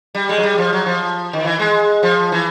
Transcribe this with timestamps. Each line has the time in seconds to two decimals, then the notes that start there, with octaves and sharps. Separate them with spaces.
0.15 G3
0.29 G#3
0.38 F#3
0.43 G3
0.58 F3
0.73 F#3
0.86 F3
1.33 D#3
1.45 E3
1.59 G#3
2.03 F3
2.32 E3